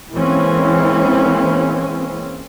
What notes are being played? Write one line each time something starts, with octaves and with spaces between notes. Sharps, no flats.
E3 G#3 A#3 C4 C#4